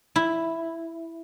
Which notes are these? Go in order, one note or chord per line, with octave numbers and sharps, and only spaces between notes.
E4